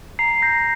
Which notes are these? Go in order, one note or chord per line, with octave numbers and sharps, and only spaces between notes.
A#5 C7
G6 A#6